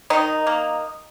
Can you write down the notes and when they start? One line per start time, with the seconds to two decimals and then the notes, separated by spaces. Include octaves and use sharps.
0.10 D#3 D#4
0.47 A#3